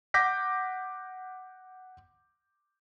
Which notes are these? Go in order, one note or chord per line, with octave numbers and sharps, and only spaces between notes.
F#5 D6 G6 A#6 B6